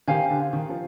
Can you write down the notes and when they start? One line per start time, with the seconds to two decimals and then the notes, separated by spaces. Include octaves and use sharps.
0.07 D#3 G4 C5 F5 G#5
0.30 D3
0.53 D#3
0.70 F3